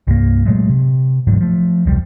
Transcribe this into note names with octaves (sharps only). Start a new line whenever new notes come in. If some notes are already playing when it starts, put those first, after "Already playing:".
C2 G2 A#3
A#2 F#3 G#3 A3
C3
A1 D2 G#2 F#3
F3 A3
E1 C2 F3 G3